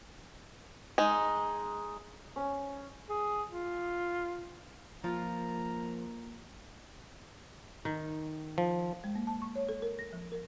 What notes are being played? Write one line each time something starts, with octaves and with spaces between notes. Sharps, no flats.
G#3 D#4
C#4
G#4
F4
F3 A#3 F4 A#5
D#3
F3
G#3
A#3
A5
C#6
C#5
A4
A#4
A#6
F3
A#4